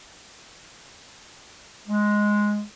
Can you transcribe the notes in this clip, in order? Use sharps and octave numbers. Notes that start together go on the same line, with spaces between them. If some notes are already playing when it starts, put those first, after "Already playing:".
G#3